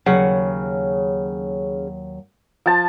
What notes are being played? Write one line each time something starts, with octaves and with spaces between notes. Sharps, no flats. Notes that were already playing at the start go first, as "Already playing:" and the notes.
D#2 C#3 F#3 F#5
F3 A5